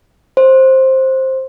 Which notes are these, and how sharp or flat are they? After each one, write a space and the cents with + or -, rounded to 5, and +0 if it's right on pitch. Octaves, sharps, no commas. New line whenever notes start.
C5 +10